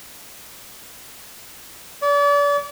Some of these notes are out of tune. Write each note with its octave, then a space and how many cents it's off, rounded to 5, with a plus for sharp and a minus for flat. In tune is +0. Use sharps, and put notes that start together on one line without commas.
D5 -40